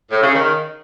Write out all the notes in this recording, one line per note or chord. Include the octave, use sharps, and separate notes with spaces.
A2
C#3
D#3